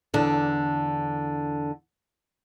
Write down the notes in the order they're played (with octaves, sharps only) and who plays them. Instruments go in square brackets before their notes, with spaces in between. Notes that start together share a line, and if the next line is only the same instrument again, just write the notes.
[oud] E2 D3 D4